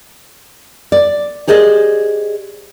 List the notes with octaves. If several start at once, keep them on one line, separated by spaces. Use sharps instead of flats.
D5
G4 G#4 C5 D5 D#5